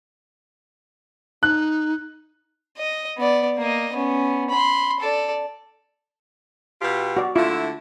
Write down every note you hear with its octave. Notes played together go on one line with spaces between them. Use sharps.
D#4 F#6
D#5
B3 D5
A#3 D#5
B3 C#4
B5 C6
A4 D5
B2 F4 G4
F#4 D5
D3 A3 E4 F4